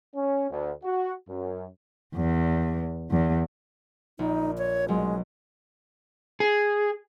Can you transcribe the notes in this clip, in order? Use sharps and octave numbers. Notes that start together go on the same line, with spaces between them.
C#4
D2
F#4
F#2
E2
E2
A#1 D#4
C#5
B1 F#3 G#3
G#4